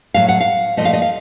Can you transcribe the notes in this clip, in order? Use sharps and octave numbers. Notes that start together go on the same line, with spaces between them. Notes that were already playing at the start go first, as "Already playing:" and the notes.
A2 F#3 A3 F5
F#5
F5
A#2 F3 A3 D#5
F5
D#5
F5